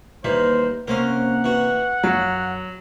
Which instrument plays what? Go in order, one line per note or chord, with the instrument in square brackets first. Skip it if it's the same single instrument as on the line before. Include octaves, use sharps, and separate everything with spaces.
[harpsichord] D#2 E3 B4 [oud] G3 A#3 E5 [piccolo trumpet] C5
[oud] C3 A#3 C#4 [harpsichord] A#4 C5 F5 [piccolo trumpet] F#5
[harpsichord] E3 F#4
[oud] F#2 [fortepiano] F#3 [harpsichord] F5